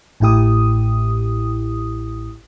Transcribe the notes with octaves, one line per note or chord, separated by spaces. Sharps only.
A1 A2 E4 G4 D#6